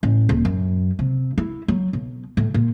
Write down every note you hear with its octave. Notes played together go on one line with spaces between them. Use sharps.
A1
D#1
F#2
C3
E4
F#3
B1
A2
A#2